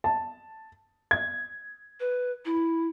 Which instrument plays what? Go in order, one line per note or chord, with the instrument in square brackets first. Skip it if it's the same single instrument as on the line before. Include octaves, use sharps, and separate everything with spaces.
[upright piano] A5
G#6
[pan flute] B4
E4